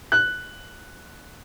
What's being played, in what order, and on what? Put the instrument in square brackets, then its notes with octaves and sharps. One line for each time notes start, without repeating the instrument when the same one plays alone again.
[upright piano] F#6